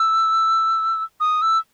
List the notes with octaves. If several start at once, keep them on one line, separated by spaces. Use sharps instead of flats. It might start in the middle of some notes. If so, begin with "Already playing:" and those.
Already playing: E6
D#6
E6